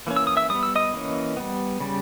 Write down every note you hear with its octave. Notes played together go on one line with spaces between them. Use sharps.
E3 A#3 C#4
E6
D#6
E5 E6
G3 B3 D#6
E6
D#5 D#6
E3 A#3 C#4
G3 B3
C#3 G3